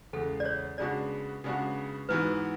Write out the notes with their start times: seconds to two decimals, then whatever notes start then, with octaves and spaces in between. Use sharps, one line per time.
0.13 E2 C#3 G#3 A4
0.40 D5
0.45 C#5
0.78 C#3 G#3 B3 D4 F#4 D5
1.44 C#3 G#3 B3 D4 F#4
2.09 G#2 E3 B3 F#4 B4